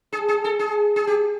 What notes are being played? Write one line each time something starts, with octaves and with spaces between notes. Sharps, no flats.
G#4
G#4
A4
G#4
G#4
G4